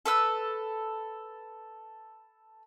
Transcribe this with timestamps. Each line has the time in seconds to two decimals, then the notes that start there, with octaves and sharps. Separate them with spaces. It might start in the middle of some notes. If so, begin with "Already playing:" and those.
0.05 A4 B4 E6